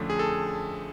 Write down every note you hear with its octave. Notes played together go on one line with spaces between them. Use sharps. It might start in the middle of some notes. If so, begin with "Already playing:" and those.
Already playing: F2 D3 F3 A3 C#4
G#4
A4